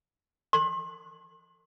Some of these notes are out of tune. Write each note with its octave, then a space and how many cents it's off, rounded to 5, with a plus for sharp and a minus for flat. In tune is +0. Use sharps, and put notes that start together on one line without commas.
C6 +35